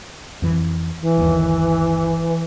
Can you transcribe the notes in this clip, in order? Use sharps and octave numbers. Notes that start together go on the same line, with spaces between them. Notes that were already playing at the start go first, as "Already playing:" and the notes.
F2 E3
E3
G1 D#2